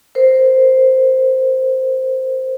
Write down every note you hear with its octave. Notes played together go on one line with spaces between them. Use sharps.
A#4 C5